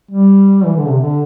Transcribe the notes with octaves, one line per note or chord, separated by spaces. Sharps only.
G3
E3
D3
C3
D3